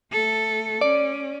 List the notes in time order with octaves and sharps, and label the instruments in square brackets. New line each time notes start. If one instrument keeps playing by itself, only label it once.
[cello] A3 A4
[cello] C#4 [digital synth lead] D5